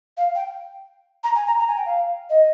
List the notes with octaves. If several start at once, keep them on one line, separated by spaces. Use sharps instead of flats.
F5
G5
A#5
G#5
A#5
A#5
G#5
G5
F5
D#5